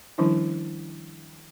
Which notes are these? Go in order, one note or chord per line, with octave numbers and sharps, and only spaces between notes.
D#3 F3 G3 C#4 D4 E4